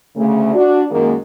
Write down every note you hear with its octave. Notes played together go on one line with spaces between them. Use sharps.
D2 C#3 A3
D4 F#4
F#2 D#3 G#3 A#3